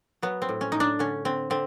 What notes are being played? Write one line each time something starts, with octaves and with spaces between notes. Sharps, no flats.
F#3 B3
C4
A2
C#4
A2 D#4
D4
D3 C#4
D3 C4
D3 C4